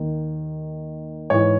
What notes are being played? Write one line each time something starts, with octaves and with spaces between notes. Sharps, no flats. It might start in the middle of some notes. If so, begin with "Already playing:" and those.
Already playing: D#2 D#3
G#2 E3 C#5